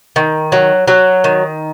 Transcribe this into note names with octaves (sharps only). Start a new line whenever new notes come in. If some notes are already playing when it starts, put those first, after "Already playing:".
D#3
F#3
F#3
D#3